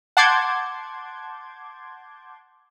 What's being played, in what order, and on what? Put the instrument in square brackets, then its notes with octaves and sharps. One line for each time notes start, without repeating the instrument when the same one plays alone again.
[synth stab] F#5 A5 C6 D6 G6 G#6